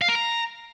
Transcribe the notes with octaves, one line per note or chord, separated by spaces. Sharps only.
F5
A#4
A#5